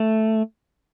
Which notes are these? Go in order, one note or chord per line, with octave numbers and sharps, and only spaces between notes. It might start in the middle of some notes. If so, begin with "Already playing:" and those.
Already playing: A3